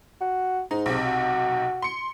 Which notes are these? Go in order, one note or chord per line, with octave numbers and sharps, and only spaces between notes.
F#4
G#2 D#4
B1 C3
F#4
C6 C#7